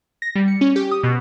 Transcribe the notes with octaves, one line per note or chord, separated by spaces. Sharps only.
A#6
G3
C#7
C#4
G4
D#6
B2